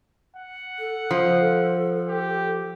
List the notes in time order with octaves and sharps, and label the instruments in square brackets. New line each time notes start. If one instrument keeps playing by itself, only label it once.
[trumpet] F#5
[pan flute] A4
[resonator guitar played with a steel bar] F3
[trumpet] G4